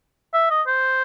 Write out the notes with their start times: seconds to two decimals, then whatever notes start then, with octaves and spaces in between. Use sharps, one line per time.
0.34 E5
0.50 D#5
0.67 C5